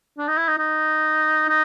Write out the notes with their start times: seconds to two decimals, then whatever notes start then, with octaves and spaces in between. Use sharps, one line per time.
0.18 D4
0.28 D#4
0.38 E4
0.48 D#4
0.58 D#4
1.49 D#4